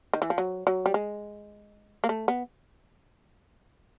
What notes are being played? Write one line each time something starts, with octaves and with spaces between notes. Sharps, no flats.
D#3
E3
F3
F#3
F#3
G3
G#3
A#3
A3
B3